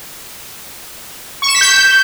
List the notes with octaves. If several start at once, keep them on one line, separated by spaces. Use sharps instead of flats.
C#6
E7
B6
G6